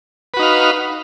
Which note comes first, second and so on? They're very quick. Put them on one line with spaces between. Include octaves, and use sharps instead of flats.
B4 F#4 D#4 F5